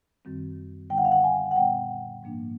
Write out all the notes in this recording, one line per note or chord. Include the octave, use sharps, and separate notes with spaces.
F#2 D#3 G3 C4
D3 G3 B3 D#4 G5
F#5
F5
F#5
G#5
F#5
A#2 G3 B3 G5
G#2 F3 A#3 D4